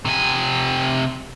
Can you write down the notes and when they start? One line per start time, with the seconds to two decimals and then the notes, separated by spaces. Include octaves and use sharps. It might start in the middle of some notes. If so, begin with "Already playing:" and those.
0.05 C3 G#5